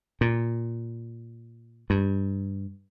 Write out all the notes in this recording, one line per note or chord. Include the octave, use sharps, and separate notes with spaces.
A#2
G2